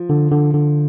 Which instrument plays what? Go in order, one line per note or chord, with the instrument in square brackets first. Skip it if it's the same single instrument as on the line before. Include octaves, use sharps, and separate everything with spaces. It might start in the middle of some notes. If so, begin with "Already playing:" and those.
Already playing: [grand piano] F3
[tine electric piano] D3
D3
D3